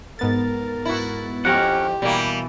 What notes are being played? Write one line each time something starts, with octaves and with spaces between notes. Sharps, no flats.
G#2 B3 A#4 A6
E4 F#4
F2 C#4 G4 A#4 F#5
B2 E3 G3 A#3